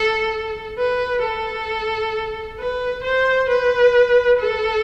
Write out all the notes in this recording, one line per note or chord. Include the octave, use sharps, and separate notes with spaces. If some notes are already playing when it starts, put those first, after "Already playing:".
Already playing: A4
B4
A4
B4
C5
B4
A4